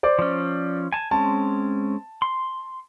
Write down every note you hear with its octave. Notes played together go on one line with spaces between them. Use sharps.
C5 D5 D6
F3 C#4
G#5 A5
G#3 C4 C#4 A5
C6